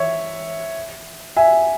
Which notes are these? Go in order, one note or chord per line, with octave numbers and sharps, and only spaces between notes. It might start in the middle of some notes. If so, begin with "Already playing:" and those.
Already playing: C#5 E5
E5 G#5